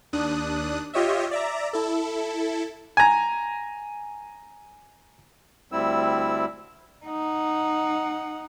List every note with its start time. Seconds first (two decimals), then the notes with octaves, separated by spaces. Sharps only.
0.13 D#2 D4 D#6 F#6
0.93 F4 G4 C#5 D#5 E5
1.31 D5 E5 A#5
1.73 E4 A4
2.97 G#5 A#5
5.72 D2 G3 C4 E4 E6
7.06 D#4 F#5